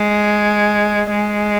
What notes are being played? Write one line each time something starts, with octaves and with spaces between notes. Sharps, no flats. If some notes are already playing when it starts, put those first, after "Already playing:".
Already playing: G#3
G#3